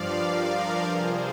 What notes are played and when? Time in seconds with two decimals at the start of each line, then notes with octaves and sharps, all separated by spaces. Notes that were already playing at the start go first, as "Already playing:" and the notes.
Already playing: G2 F3 D5 F5
0.15 A#4 D5
0.84 F2 C3 F3 G#4 C5